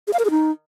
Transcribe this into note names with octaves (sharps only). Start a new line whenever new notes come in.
G#4
F5
A#4
G#4
D#4